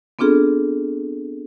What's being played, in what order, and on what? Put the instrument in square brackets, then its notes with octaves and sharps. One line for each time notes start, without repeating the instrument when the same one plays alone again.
[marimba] B3 C4 D4 F4 G#4 A4